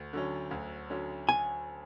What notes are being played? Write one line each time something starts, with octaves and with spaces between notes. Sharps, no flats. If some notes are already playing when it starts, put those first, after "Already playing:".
Already playing: D2
D3 F#3 C#4
D2
D3 F#3 C#4
G#5